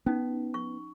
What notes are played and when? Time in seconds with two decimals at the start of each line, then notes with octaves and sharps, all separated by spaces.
0.06 B3 C#4 D#4
0.54 C#6